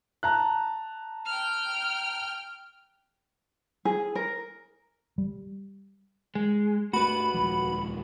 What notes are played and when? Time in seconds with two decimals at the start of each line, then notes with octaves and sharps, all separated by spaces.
0.23 A5 A#5 F#6
1.26 G5 F6
3.85 G#4
4.15 A#4
5.18 G3
6.35 G#3
6.93 G2 A3 F#4 B4 B5
7.34 D#1 C#2 F3